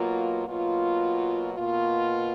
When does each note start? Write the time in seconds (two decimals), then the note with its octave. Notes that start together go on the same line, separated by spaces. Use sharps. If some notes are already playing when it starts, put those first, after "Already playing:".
Already playing: B2 F#3 A#3 F4
0.45 B2 F#3 A#3 F4
1.54 B2 A#3 F4